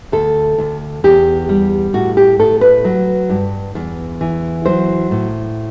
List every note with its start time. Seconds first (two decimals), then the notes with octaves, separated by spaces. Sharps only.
0.12 D2 A4
0.58 D2
1.04 E2 G4
1.49 G3
1.93 A2 F#4
2.17 G4
2.39 A2 A4
2.61 B4
2.84 F#3
3.29 G2
3.75 E2
4.21 E3
4.65 F#3 C5
5.11 A2